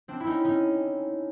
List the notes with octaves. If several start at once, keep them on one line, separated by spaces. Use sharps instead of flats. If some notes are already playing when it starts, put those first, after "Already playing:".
C4 D4
E4
C#4 D#4
C#4 D#4